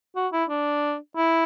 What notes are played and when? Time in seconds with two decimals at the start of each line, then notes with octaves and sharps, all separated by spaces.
0.16 F#4
0.32 E4
0.49 D4
1.16 E4